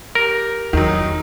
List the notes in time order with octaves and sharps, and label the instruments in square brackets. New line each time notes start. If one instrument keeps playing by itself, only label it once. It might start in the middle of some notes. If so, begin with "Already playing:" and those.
[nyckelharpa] G4 [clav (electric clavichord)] A#4
[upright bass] E2 [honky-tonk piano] D#3 F#3 [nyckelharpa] D#4